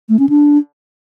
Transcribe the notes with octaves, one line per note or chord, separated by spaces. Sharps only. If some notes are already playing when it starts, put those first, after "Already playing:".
A3
C#4
D4